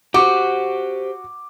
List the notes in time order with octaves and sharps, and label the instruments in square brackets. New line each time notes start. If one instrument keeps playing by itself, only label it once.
[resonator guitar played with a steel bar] F#4 [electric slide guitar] G4 C5 [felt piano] D6